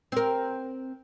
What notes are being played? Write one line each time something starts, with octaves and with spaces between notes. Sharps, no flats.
C4 A#4